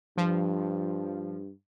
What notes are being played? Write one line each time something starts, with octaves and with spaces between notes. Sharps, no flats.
G2 F3